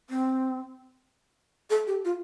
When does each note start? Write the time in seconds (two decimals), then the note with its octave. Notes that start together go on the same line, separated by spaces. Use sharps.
0.10 C4
1.70 A4
1.87 G4
2.05 F4